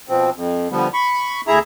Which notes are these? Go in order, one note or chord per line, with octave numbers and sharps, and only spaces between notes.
B2 F3 C4
F2
D3 F3 G3 B3
B5 C#6
D2 E4 G#4 E5 A#5